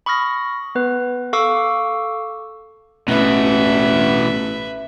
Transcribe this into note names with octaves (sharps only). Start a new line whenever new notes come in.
B5 C#6 D#6 F6 A#6
B3 B4
A4 F5 C#6 D6 E6
A1 B2 E3 B4 E5